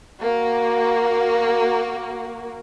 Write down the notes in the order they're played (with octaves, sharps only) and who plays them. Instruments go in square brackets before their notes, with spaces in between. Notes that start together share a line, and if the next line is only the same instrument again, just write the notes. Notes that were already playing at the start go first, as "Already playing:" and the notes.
[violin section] A#3 F#4